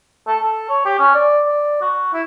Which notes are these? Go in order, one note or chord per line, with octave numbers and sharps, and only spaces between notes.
A4
A4
C#5
G4
C#4
D5
D5
F#4
E4